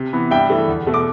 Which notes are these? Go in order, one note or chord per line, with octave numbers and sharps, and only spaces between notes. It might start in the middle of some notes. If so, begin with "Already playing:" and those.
Already playing: C3
E3 B3
G2 E5 G5
E3 A3
E2
B2 A3
D6